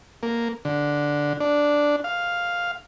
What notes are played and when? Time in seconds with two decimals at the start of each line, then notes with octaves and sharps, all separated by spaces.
0.23 A#3
0.65 D3
1.40 D4
2.04 F5